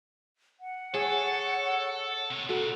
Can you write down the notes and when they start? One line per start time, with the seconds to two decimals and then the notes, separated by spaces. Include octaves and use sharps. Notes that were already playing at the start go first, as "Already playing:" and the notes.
0.60 F#5
0.94 G#4 A4 C#5
2.31 C3 C#5
2.49 A#2 C#3 F#4 A4